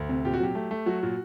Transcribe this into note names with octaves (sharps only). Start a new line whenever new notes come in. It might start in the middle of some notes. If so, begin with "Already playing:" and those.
Already playing: D2
C3
A#2 G4
F#4
F#3 G4
A3
A3
F#3 F#4
A#2